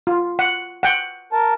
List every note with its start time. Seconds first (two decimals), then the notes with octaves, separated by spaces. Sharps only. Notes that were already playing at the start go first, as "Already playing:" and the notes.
0.07 F4
0.39 F#5
0.83 F#5 G5
1.32 A#4 A5